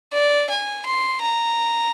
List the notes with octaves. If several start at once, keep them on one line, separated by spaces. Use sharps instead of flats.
D5
G#5
C6
A#5